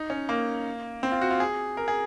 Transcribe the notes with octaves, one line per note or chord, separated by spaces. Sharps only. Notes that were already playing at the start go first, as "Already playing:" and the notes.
Already playing: D#4
C#4
A#3
C4
F4
F#4
F4
G#4
A#4
G#4